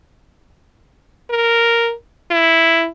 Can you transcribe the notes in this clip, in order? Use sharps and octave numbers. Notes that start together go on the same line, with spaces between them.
A#4
E4